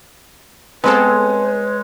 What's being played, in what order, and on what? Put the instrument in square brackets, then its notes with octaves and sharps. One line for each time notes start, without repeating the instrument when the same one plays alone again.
[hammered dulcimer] G#3 C#5 [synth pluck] B3 C4 A4 [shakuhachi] B4